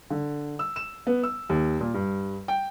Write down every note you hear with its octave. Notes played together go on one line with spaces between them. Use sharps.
D3
E6
E7
B3
E6
D#2
A#2
G2
G5